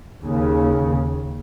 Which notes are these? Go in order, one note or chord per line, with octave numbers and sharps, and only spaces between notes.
D#2 C#3